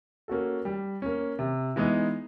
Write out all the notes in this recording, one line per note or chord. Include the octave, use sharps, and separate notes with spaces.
A#3 C#4 F#4 A4
G3
A#3 C#4
C3
E3 G#3 B3 D#4